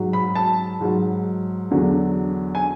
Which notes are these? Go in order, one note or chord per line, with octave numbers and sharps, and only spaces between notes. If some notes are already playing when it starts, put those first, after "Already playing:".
Already playing: G#2 F#3
B5
A5
G#2 F#3
E2 D3 F#3
G#5